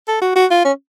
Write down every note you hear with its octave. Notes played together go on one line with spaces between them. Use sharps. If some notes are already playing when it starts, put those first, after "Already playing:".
A4
F#4
F#4
F4
C#4